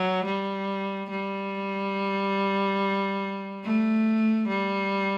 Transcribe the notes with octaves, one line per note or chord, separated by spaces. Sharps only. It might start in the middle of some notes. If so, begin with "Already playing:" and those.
Already playing: F#3
G3
G3
A3
G3